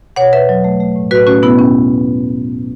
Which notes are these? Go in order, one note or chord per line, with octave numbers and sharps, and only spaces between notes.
B2 C#5 F#5
E2 B4 E5
F#3
A3
A3
A2
A2 F#4 B4
A3 C#4 F#4
B2 B3 E4
E2 C#4